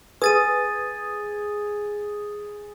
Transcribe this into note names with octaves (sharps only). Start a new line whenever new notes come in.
G#4 B4 D#6 A6 D#7